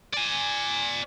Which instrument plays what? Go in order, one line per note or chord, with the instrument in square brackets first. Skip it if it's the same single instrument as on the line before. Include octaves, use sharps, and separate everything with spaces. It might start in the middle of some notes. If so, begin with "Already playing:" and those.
[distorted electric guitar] D5 G#5